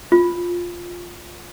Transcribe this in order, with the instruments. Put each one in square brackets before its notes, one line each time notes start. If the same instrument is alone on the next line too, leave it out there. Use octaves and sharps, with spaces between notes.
[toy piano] F4